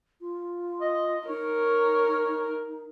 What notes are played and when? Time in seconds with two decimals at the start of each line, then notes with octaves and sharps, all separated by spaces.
0.21 F4
0.81 D#5
1.28 D#4 A#4 C#5